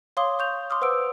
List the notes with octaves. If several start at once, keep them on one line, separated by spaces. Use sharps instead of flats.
C#5 F5 C6 D6 D#6 G7
C#6 G6 F7
C6 D6 D#6 F6
B4 C5 F#5 E6 D7